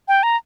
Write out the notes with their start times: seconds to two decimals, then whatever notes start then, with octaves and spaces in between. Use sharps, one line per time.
0.08 G5
0.23 A#5